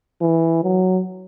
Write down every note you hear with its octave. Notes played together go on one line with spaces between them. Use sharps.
E3
F#3